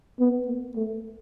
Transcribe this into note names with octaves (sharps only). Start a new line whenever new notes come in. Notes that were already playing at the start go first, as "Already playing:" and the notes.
B3
A#3
A3